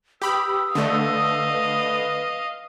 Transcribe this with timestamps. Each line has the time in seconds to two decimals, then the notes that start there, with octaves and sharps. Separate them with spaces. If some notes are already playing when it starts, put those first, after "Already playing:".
0.22 G4 B4 B5 D#6 E6
0.75 D3 A3 D#5 F5
1.54 B4